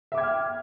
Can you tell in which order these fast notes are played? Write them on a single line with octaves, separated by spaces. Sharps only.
E5 D6 G#6 G5 F6